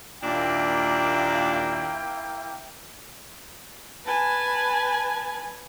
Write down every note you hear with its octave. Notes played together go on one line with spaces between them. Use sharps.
D#2 A#2 A#3 D4 E4 G5
B4 G#5 A5